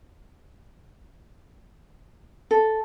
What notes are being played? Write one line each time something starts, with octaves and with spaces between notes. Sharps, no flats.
A4